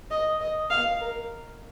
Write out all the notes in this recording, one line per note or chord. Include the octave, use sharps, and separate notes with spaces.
D#5
D#5
F5
A#4